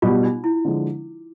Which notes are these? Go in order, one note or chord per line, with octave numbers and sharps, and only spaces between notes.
B2 G3 B3 F4
D#4
E4
D3 F3 G#3